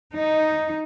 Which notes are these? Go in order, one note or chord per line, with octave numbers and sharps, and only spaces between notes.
D#4